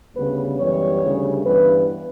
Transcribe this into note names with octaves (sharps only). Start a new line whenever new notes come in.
D2 C#3 G3 B3 B4
F#2 E3 G3 B3 C#5
D2 C#3 G3
G2 E3 B3 B4